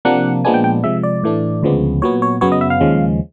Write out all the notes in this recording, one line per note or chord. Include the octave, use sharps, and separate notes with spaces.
C3 F3 A#3 D4 F#5
A#2 F3 G#3 B3 D4 G#5
G5
G5
C3 F3 G#3 E5
D5
A2 E3 A3 D4
D2 C#3 F3 G#3 B3
A#2 F#3 B3 C#5
C#5
F#2 C#3 F#3 B3 C#5
D#5
E5
F5
D#2 C#3 F3 G#3